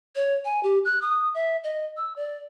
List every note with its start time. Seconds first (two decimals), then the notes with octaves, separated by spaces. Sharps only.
0.16 C#5
0.45 G#5
0.63 G4
0.85 F#6
1.02 D#6
1.34 E5
1.64 D#5
1.97 E6
2.16 D5